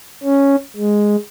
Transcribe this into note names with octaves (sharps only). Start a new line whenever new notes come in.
C#4
G#3